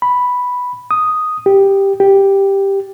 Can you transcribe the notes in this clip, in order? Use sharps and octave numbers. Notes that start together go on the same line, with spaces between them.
B5
D#6
G4
G4